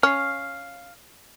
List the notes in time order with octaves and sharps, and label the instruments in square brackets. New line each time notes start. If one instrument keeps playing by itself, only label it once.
[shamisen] C#4 [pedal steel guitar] F5 F6